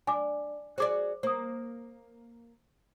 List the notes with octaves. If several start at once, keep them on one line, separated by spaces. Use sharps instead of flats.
D4 G#5 D6
F#4 G#4 C5 D5 D6
A#3 C5 D#6